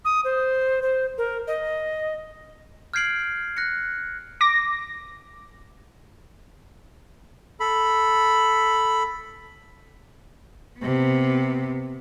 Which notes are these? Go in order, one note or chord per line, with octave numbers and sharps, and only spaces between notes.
D#6
C5
C5
A#4
D#5
F6 G6 G#6 C7 D7 F#7
F6 F#6 A#6 C#7
D6 A#6
A4 B5
C3 B3